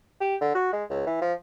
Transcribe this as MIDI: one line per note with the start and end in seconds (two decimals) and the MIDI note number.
0.21 0.36 67
0.41 0.50 50
0.55 0.71 66
0.73 0.84 56
0.90 1.03 37
1.07 1.20 52
1.21 1.33 53